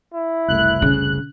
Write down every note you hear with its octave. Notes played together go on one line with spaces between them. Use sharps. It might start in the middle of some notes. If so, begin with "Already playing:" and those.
E4
F#1 C2 A3 F#6
C#3